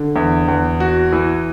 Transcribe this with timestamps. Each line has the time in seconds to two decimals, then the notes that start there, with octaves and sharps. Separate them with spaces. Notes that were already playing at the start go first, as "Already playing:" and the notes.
Already playing: D3
0.16 E2
0.48 E2
0.80 F#4
1.12 E3